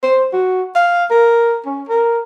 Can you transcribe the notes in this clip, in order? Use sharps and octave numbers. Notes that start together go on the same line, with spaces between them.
C5
F#4
F5
A#4
C#4
A#4